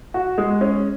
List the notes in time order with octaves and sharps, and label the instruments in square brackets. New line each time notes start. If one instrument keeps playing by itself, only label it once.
[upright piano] F#4
G#3
C#4